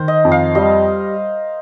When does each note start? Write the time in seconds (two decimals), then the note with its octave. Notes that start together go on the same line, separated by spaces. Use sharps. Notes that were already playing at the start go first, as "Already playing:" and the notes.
Already playing: D#3 A#4 C5
0.08 D#5
0.25 F2
0.32 F5
0.55 G3 D#5